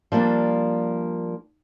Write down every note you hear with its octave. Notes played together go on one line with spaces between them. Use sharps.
F3 G3 A#3 D4